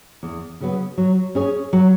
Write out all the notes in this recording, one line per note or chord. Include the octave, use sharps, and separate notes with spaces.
E2
C#3 F#3 B3
F#3
C#4 G#4 C#5
F#3